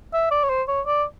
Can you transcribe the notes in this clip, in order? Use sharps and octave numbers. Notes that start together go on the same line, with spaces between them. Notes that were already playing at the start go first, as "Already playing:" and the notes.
E5
D5
C#5
C5
C#5
D5